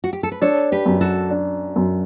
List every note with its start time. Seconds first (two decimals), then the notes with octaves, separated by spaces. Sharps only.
0.04 F#4
0.13 G4
0.23 A4
0.32 B4
0.42 D4 A4 C#5
0.72 G4 B4
0.86 F#2
1.01 F#4 A4
1.31 D4
1.76 F#2